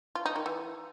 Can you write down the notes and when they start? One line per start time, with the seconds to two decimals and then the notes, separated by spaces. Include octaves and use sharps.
0.15 F4
0.26 D#4
0.36 D#3
0.46 E3